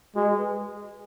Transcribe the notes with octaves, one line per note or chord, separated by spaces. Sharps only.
G#3 F#4
G#4
B4